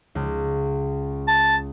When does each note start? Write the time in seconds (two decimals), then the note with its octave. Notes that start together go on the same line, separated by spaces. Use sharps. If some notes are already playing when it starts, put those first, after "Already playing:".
0.15 C#2
1.28 A5